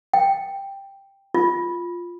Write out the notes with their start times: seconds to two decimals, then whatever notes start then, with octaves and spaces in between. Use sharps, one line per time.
0.14 G5
1.34 F4